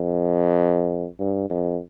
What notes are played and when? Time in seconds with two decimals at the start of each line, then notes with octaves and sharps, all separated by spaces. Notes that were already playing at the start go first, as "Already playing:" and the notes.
Already playing: F2
1.20 G2
1.50 F2